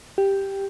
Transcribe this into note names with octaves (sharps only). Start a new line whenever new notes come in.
G4